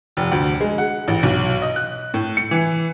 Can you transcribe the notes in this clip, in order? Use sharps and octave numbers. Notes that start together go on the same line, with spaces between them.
F1
D2
G#3
F#5
A1
B1
D#5
F#6
A2
C#7
E3